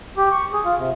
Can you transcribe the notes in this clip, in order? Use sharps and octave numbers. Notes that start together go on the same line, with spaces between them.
G4
C#6
G#4
F4
C3